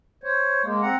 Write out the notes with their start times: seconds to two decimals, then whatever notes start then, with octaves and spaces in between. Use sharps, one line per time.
0.23 C5 C#5
0.64 G#3 A#3
0.82 C4 F#5 A#5